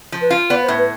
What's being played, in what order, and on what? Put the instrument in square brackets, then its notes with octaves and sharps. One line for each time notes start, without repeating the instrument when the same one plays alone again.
[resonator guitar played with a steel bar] F3
[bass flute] B4
[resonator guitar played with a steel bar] F4
[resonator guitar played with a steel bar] B3 [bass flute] D5
[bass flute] C5
[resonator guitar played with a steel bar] A2
[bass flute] B4